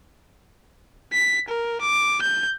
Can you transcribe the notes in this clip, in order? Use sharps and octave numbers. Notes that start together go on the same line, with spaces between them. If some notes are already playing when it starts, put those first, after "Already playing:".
B6
A#4
D6
G6